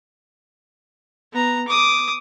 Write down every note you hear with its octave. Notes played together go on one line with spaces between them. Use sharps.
B3 A#5
D6 D#6